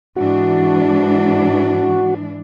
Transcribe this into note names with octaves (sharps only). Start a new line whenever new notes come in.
G#2 E3 D4 F#4